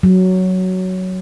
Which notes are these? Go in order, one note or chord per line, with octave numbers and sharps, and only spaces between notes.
F#3